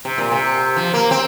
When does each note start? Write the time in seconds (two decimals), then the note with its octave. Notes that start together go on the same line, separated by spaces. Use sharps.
0.05 C3
0.18 A#2
0.32 C3
0.76 F3
0.94 A#3
1.11 C4